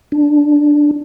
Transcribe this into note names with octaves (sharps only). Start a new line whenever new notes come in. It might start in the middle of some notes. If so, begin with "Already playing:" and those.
D4